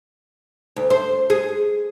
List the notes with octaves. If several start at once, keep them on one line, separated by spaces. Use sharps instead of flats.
D2
C5
G#4